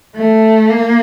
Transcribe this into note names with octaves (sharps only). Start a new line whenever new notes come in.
A3
A#3